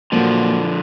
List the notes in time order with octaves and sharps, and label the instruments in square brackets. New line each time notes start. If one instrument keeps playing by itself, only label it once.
[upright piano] A#2 F#3 A#3 [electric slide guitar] D3 F3